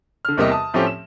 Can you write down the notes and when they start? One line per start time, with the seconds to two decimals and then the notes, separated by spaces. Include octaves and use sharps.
0.25 D3 F6
0.37 E2 C3 G3 A#3 G4 D#5
0.51 A5 D#6
0.74 A2 F3 A3 C4 C#4 G4
0.87 E7